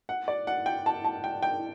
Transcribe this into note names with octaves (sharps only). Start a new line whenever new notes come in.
F#5
D5
F#5
G5
A5
A5
G5
G5